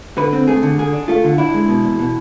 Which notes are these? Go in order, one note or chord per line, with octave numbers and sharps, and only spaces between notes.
D3 B4
C4
A3 G#4
D3
D3 G#4
D4
A3 F4
D3
D4 E4
G#3
B2
E2
B2